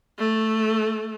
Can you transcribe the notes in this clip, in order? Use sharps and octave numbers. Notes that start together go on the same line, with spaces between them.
A3